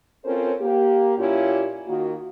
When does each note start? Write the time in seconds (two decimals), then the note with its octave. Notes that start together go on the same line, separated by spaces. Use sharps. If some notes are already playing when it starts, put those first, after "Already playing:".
0.25 C4 C#4 F4 A4 A#4 C5
0.62 A#3 G4
1.17 A#2 C#4 E4 F4 G4
1.87 D#3 A#3 F4 F#4